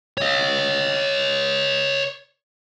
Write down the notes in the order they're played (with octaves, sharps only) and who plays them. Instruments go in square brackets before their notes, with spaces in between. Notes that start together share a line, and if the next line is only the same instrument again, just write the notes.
[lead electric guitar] C#5 D#5